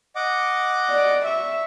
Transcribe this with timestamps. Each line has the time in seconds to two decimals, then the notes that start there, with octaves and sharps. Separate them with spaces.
0.16 D#5 F#5 D6
0.91 D5
1.25 E5 C#6